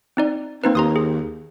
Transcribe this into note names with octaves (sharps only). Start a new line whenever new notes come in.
C4 D#4 D5
A#3 C4 D#4 B4
D#2 A#5 C6 D#6
G#4